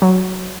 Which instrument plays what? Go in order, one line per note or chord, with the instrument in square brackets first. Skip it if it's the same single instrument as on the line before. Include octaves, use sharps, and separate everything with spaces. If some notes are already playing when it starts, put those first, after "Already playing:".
[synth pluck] F#3